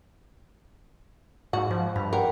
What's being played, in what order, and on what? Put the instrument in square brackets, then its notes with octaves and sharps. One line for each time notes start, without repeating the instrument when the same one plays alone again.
[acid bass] G#2 [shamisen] F#4
[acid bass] F3 [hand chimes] C5
[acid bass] G2 [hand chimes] B5
[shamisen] A#4 [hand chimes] F#5 G5